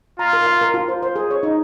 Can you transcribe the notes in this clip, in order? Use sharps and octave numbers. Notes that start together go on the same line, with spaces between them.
F4 A#5
A#4
F5
A#4
F4
C5
C5
G#4
C#5
D#4